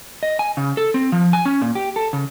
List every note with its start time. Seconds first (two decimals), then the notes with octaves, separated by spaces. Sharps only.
0.23 D#5
0.39 G#5
0.57 C#3
0.77 A4
0.94 C4
1.12 F3
1.33 G#5
1.45 C#4
1.62 A#2
1.75 G4
1.96 A4
2.13 C#3